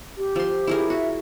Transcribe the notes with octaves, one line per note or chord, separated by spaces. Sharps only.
G4
F3 C6
E4 G#4 A#4
F#4 E5